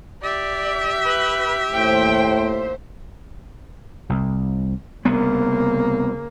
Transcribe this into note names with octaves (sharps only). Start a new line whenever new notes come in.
G4 D5 E5
B4
D#2 A2 C5 G5
C2
C2 C#3 A#3 B3